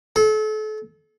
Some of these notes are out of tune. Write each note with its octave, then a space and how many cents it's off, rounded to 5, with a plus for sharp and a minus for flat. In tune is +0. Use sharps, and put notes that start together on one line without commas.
A4 -35